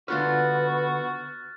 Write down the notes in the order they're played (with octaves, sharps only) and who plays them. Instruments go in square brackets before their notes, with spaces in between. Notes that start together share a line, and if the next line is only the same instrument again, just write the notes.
[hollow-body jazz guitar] D3 F4 B4 [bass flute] B3 [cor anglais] F#4 [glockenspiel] F6 F#6 A6